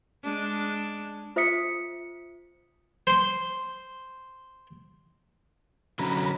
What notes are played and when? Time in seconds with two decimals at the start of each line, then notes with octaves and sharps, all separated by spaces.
0.23 G#3 D4
1.36 F4 C5 E5 D#6 B6 C#7
3.07 C5 C6
5.99 D3 F#3 C#4 A#5 B5